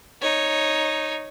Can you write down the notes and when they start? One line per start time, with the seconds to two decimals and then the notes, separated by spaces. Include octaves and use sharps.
0.22 D#4 C#5